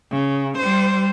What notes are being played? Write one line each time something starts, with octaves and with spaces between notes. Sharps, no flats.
C#3
G3 C5